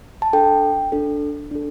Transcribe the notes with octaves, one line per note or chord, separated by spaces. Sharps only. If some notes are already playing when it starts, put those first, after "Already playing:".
A5
D4 A4 G5
D4 A4
D4 A4